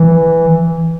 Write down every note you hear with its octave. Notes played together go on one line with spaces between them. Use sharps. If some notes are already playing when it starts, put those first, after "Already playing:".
Already playing: E3